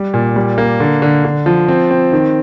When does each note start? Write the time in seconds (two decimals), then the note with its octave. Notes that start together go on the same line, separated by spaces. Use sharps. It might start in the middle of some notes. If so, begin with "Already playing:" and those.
Already playing: G3
0.14 A#2
0.36 G3
0.58 A#3
0.80 D3
1.02 D3
1.25 D3
1.46 F3
1.68 C4
1.91 C4
2.12 D#3